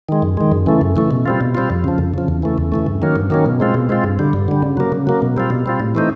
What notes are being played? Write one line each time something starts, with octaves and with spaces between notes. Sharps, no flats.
D#3 G#3
F#2
D#3 G#3
F#2
C#3 E3 A3
F#2
C#3 E3 A3
B2
G3 C4 F4
B2
G3 C4 F4
F2
C#3 F3
F2
C#3 F3
E2
C#3 E3 A3
E2
C#3 E3 A3
G2
D#3 F#3 A#3 C#4
G2
D#3 F#3 A#3 C#4
B2
G#3 C4 F4
B2
G#3 C4 F4
G2
D3 G3
G2
D3 G3
C#3
F#3 A#3
C#3
F#3 A#3
B2
G3 C4 F4
B2
G3 C4 F4
A2
E3 A3 C4 D#4